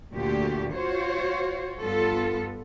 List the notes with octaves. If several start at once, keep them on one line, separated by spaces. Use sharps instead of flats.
D2 A#2 D3 F#4 G4
F4 F#4 C5 C#5
G2 B3 F4 A4